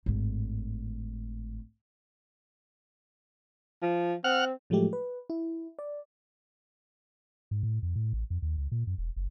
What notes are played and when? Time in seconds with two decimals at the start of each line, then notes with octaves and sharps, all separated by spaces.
0.06 G#1 A2
3.82 F3
4.24 C4 F#5 F6
4.70 A2 F3 F#3 G#3 A3 G4
4.93 B4
5.30 E4
5.79 D5
7.51 G#2
7.63 A2
7.83 F2
7.96 A2
8.13 A1
8.30 F2
8.42 D#2
8.58 C#2
8.72 A#2
8.87 F#2
8.98 E1
9.16 F#1